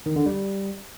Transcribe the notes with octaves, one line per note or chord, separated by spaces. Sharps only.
D#3
D3
G3